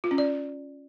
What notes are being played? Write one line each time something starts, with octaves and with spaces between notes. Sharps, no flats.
F4
C#4
D5